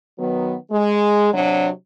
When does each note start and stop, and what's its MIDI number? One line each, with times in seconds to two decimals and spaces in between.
0.19 0.55 51
0.19 0.55 54
0.19 0.55 59
0.71 1.29 56
1.33 1.69 48
1.33 1.69 54
1.33 1.69 62